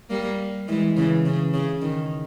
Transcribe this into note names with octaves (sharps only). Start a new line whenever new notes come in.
G3 A#3
E3 G#3
C#3 E3
C#3
C#3
D#3